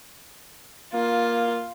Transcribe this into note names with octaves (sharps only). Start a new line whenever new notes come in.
A#3 F4